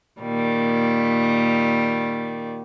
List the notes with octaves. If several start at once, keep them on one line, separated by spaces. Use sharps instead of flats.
A#2 D#3 G3